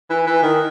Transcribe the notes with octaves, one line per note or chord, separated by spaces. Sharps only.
E3
E3
D#3